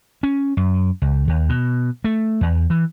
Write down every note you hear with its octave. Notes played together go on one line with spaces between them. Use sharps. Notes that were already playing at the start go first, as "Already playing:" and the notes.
C#4
F#2
C#2
D#2
B2
A3
E2
E3